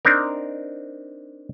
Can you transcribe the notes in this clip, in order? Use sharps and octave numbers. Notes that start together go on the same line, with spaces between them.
C4 D4 D#4 A#4